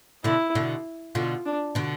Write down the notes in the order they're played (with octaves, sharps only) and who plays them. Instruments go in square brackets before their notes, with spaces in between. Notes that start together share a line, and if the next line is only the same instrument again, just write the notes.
[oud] B2 D3 [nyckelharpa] E4
[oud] B2 D3
[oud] B2 D3 [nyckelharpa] F4
[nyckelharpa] D4
[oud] B2 D3